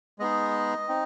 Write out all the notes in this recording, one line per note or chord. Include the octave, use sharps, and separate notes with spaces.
G#3 B3 D#4 G#4 D#5
C4 D#4